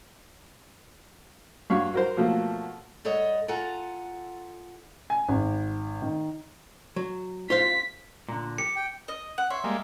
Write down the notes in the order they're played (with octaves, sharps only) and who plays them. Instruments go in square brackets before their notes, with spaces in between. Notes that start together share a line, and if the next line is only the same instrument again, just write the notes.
[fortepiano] G2 F#3 C#5 F5
F#3 A#4 C5
B2 F3 F#3 A3 A#3
[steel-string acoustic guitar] G2 A4 C#5 D#5 F#5
F4 A4 F#5 G#5 A#5
[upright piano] G#5
G#1
D#3
[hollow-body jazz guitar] F#3
[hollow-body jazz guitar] F4 C5 F5 [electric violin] B6
[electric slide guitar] A#2 D3
[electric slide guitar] G4 [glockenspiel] C#7
[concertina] G5
[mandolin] D#5
F#5
[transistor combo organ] C#5 C6 [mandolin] E5
[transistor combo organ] G3 G#3 A#3